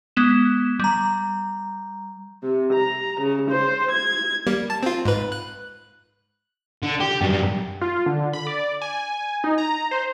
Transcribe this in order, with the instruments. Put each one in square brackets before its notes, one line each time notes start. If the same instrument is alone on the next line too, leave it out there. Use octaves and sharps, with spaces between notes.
[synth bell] G#3 B3 E7
G3 A#5
[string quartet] C3
A#5
C#3
C5
G#6
[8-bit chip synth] G3 A#3
A5
C4 F4
G#2 B4
F#6
[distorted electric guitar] D3
G4
F#2 G3
[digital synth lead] F4
D3
B5
D5
G#5
D#4
A#5
C5